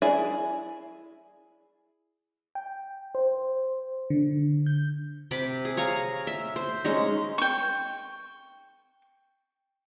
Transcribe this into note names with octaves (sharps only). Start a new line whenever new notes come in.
E4 G#4 D5 E5 G#5
G5
C5
D3
G6
C3 G4 B5 D6
G#4
C#5 F5 G#5 A#5
E5
C5
G#3 C#4 D#4
G5 C#6